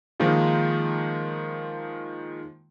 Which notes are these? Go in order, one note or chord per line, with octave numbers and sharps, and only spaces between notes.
D#3 F3 G#3 A#3 D#4 F4